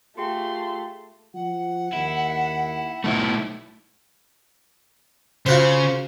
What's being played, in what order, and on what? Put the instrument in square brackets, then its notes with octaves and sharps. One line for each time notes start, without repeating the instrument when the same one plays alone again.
[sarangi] A3 [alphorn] F4 [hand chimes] G4 G#4 G5 [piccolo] C6
[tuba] F3 [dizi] F#5
[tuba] D#2 [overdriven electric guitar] E4
[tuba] B1 [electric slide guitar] A3 D#4 E4
[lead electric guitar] C#3 [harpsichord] F4 F#4 C5